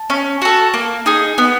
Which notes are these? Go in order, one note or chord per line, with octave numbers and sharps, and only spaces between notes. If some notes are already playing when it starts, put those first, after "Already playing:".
Already playing: A5
C#4
F#4 A4
A#3
D#4 G#4
B3